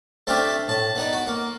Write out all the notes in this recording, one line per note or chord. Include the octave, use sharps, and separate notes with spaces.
A3 C4 D4 F4 G4 E5
A2 A5
B3 D#4 D5
F#4
A#3